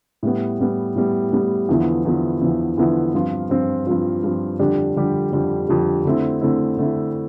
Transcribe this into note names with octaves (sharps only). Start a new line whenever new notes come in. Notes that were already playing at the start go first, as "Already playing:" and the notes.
A2 G3 B3
A2 G3 B3
A2 G3 B3
A2 G3 B3
E2 D3 F3 B3 E4
E2 D3 F3 B3 E4
E2 D3 F3 B3 E4
E2 D3 F3 B3 E4
G2 F3 C4 F4
G2 F3 C4 F4
G2 F3 C4 F4
G2 F3 C4 F4
F2 D3 G3 D4 G4
F2 D3 G3 D4 G4
F2 D3 G3 D4 G4
F2 D3 G3 D4 G4
D3 A3 C4 E4
D3 A3 C4 E4
D3 A3 C4 E4